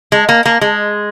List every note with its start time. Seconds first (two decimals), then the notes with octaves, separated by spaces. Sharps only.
0.12 G#3
0.29 A#3
0.46 A#3
0.61 G#3